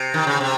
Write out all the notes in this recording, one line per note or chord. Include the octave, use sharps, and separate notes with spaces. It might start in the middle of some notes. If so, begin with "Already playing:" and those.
Already playing: C3
D#3
C#3
C3